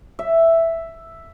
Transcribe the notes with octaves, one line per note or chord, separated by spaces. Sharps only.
E5